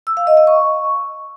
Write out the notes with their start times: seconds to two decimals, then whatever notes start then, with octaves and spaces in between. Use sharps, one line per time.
0.07 E6
0.17 F5
0.27 D#5
0.37 D#5
0.47 C#6